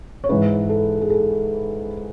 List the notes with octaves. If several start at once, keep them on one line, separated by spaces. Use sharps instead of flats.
C#5
G#2 E3 B4
A4
G#4
A4